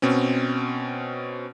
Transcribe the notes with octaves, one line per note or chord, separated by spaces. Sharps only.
B2 C4 C#4